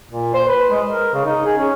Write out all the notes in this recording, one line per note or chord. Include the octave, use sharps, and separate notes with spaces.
A#2
C5
B4
G#3
A#4
C#3
D#4
G#4
C#4